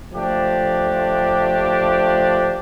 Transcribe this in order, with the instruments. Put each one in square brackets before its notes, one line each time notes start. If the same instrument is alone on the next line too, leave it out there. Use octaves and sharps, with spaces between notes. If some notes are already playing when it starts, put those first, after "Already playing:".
[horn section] F3 A3 D4 G4